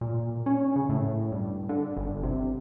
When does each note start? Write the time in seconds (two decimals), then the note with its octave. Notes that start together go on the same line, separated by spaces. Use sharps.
0.01 A#2
0.46 C#4
0.76 C#3
0.89 A2
1.32 G2
1.69 D3
1.97 G1
2.23 C3